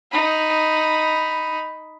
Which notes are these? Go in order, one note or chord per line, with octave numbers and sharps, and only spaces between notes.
D#4 B5